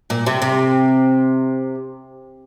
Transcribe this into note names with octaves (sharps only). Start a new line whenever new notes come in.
A#2
C3
C3